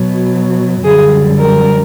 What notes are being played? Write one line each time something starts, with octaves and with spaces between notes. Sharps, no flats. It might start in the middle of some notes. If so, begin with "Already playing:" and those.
Already playing: B2 F#3
F#2 D3 G3 G#4
A#4